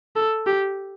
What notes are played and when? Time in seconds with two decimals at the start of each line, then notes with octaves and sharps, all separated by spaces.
0.16 A4
0.47 G4